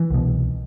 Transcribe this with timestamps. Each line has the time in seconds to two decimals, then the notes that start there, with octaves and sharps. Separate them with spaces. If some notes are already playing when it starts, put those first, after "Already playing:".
Already playing: E3
0.10 C2 B2